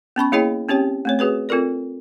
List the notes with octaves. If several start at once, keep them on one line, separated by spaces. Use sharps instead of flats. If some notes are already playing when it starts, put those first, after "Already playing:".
B3 C#4 B5 C#6
A#3 E4 G#4 C#5 D#5 G5
C4 C#4 G4 C#5 G5
A3 C4 C#5
F#4 G#4 B4 C#5
C4 F4 A4 A#4 D5